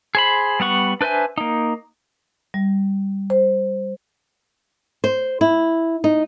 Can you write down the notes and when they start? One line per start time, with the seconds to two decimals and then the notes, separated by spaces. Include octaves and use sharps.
0.15 G#4 C5 B5
0.60 G3 B3 F#5 C#6
1.01 D4 B4 C5 E5 G#5
1.38 A#3 D#4
2.54 G3
3.30 C5
5.04 C5
5.41 E4
6.04 D#4